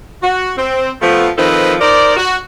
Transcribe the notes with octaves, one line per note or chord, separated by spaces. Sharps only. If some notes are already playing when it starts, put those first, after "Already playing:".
F#4
C4
F3 A3 B3
D#3 F3 C4 A4 B4 D#5
D#4 A#4 C5 D5
F#4